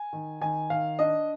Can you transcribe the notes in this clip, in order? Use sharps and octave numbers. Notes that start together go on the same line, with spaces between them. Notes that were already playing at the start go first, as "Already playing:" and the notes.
Already playing: G#5
D#3
D#3 G#5
D#3 F5
D4 D#5